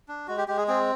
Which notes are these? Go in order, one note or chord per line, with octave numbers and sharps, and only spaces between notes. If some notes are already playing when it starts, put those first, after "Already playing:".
D4
G#3 F#4
G4
G#3 G4
G#4
C4 G#4